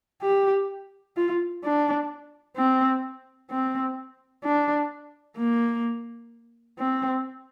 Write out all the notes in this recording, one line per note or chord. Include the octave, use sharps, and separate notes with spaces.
G4
F4
D4
C4
C4
D4
A#3
C4